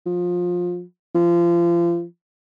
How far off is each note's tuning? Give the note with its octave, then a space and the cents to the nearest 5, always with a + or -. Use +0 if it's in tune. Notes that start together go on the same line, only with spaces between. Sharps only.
F3 +20
F3 -30